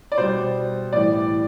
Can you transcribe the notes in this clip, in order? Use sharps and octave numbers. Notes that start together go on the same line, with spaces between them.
D5
B2 G3 C5
A2 E3 G3 D5